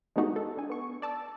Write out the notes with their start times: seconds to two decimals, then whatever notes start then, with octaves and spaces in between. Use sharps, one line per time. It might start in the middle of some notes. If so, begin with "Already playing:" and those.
0.16 G#3 A3 B3 D#4 F#4 G4
0.36 A4
0.57 D4 G#5
0.70 B3 C#6
1.02 D5 A5 D6 E6